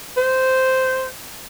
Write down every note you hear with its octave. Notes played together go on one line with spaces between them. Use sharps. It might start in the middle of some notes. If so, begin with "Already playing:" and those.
C5